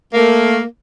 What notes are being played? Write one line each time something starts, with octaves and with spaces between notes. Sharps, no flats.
A3 A#3